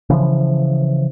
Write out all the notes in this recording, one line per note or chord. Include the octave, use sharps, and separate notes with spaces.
C#3 E3 F3